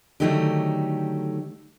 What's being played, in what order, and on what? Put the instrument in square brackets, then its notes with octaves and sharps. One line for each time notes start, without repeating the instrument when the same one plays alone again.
[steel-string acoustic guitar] D3 D#3 F#3 A3 D#4 G4